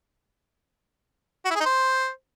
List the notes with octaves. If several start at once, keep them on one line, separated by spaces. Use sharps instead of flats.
F#4
E4
G#4
D#4
C5